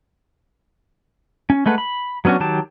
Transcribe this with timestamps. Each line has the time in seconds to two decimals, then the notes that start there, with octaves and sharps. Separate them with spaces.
1.50 C#4
1.66 G#3 A3 B4 F#5
1.78 B5
2.25 F#3 B3 C#4 D4 F#4
2.40 D#3 F#3 G4 A5